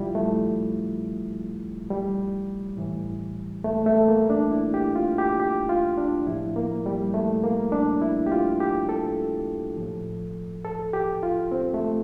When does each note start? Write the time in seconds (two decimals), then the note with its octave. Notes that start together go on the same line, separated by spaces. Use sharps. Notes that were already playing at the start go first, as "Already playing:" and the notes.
Already playing: A#2 F3 G3 E4 F4
0.15 A3
1.90 G3
2.77 A2 E3
3.64 A3
3.86 A3
4.08 A#3
4.30 D4
4.52 E4
4.74 G4
4.96 F4
5.18 G4
5.40 G4
5.69 F4
5.97 D4
6.27 A2 F3 E4
6.56 A#3
6.86 G3
7.14 A3
7.44 A#3
7.72 D4
8.02 E4
8.26 G4
8.32 F4
8.60 G4
8.89 A4
9.77 A2 F3
10.64 A4
10.93 G4
11.23 F4
11.52 C4
11.74 A3